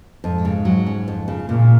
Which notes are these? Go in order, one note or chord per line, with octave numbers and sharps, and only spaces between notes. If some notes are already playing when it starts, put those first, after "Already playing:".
F2 G#2
C#3
F#3
C#4
F2
C#3
A#2 C#3